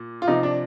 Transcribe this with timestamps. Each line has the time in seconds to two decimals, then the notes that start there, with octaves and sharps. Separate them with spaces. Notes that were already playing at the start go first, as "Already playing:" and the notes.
Already playing: A#2
0.22 F4
0.27 C3 F3 D#4
0.43 D4